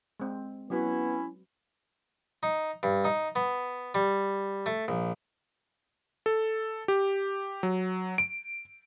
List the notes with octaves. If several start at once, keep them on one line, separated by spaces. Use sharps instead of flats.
G#3 C4
F#3 B3 C#4 E4 F#4 B4
D#4
G2
D#4
B3
G3
A3
A#1
A4
G4
F#3
D7